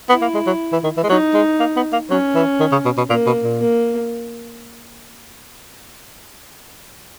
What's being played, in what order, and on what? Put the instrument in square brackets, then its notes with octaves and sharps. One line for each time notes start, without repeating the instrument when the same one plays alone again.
[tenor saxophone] B3 [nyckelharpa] E4
[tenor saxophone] A#3
G#3
F#3
E3
D#3
E3
G#3
[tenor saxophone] F#3 [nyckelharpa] D#4
[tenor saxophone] G#3
A#3
B3
A#3
[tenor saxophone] F#3 [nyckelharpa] C#4
[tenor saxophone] E3
D#3
C#3
B2
B2
[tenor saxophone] A#2 [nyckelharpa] A#3
[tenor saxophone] B2
A#2
[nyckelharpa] A#3